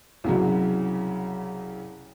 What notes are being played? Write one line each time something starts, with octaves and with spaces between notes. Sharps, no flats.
C2 C#3 F#3